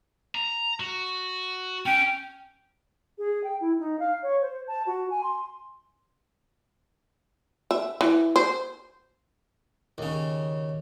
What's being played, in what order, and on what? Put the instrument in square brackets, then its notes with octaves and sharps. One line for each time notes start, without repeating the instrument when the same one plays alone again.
[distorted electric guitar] A#5
F#4
[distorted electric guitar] C#4 [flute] G5
[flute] G#4
G5
E4
D#4
F5
C#5
C5
A5
F#4
G#5
C6
[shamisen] E5
E3
C5
[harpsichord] D#2 C#3